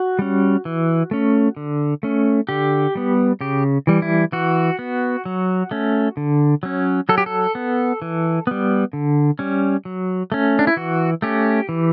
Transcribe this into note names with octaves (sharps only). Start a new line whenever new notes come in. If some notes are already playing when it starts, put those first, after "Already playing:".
Already playing: F#4
G3 C#4
E3
A3 C#4
D3
A3 C#4
D3 G4
G3 B3
C#3 G4
E3 G3
E4
E3 F#4
B3
F#3
A3 C#4
D3
F#3 C#4
F#3 A4
G4
A4
B3
E3
G3 B3
D3
G3 C#4
F#3
A3 C#4
D4
E4
E3 F#4
A3 C#4 G4
E3